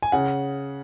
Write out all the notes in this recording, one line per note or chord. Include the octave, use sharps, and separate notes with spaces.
G#5
C#3 F#5